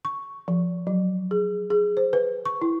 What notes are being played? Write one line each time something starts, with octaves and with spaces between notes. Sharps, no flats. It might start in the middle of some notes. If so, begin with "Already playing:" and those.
C#6
F3
F#3
G#4
G#4
C5
B4
C#6
E4